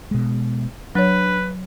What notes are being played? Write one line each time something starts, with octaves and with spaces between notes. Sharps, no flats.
B2 G#3
F#3 D4 B4 C#5